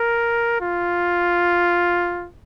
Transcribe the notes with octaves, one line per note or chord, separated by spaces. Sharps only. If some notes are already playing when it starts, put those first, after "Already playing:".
Already playing: A#4
F4